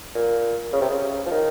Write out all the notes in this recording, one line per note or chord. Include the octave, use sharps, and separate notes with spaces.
A#2
C#3
C3
C#3
F3
D#3